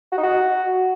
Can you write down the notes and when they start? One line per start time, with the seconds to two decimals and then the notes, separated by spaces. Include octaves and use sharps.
0.12 F#4
0.18 D#4
0.23 F#4